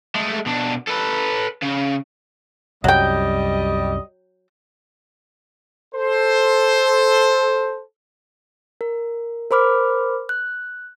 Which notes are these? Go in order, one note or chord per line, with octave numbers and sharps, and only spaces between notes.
G#3 A3
B2 D4
A4 B4
C#3
C2 F#2 F#3 G3 D#5 G5
A4 C5
A#4
A#4 C5 B5 D6 F6
F#6